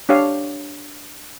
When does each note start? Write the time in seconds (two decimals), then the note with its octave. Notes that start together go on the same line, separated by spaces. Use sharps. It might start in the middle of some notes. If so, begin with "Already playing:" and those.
0.09 D4 G4 C#5 F5